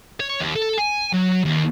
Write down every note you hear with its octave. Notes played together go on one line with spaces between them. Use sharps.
C#5
D#2
A4
G#5
F#3
D#2